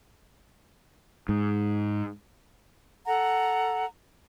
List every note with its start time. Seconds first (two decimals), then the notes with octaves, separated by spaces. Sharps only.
1.29 G#2
3.06 A4 F#5 A#5